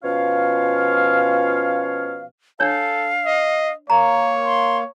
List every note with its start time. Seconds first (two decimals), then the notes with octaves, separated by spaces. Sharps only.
0.04 B2 F3 C#4 F4 C#5 F5
2.60 D4 A4 C#5 F5
3.26 D#5
3.90 A#3 C#5 A#5
4.44 C6